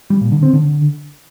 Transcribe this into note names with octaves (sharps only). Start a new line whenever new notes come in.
G3
A#2
D3
C4
D3